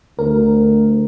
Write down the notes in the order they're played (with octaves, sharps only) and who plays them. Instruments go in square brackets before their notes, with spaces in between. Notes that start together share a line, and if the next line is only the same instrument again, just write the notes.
[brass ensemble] D2 [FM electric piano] A#4